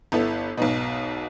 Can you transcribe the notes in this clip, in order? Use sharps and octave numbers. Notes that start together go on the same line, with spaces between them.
G1 B3 E4 A4
B1 G#2 B2